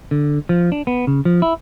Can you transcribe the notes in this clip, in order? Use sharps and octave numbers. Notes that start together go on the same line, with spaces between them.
D3
F3
D4
B3
C#3
F3
E4